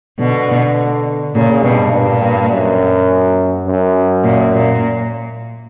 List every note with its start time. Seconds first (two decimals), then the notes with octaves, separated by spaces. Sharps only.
0.19 B2 D3
1.34 A#2 C#3
1.63 G2 B2
1.92 G2 A#2
2.21 G2
2.50 F#2
3.66 F#2
4.24 A#2
4.53 A#2